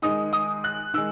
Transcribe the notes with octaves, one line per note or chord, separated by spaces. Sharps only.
D#3 G#3 D#4 D#6
D#6
F#6
D#3 G#3 E6